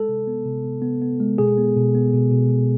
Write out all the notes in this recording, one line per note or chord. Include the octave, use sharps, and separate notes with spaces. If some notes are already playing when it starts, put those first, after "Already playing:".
Already playing: G#3 A4
C3
B3
C3
B3
B3
B3
G#3
B2 G#4
B3
B2
B3
B2
B2
B2